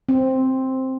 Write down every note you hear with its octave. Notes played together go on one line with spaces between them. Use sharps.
C4